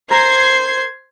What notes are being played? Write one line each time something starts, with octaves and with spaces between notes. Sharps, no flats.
A#4 C5 G#6 C7